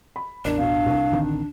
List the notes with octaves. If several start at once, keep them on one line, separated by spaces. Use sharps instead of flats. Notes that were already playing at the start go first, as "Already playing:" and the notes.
B5
A1 E2 D4 A#4 D5
B2 F5
C2
A1 D2 D#3 C4